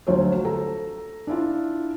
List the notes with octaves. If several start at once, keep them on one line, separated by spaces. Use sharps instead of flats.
D2 F#3 F4 C5 C#5
A4 A#5
D4 E4 F4